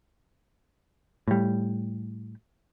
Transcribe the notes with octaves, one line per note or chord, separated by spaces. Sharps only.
A2 G3